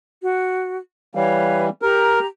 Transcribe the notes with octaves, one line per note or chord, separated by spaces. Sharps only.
F#4
E3 G3 B4 C#5 F5
G4 A#4 A#5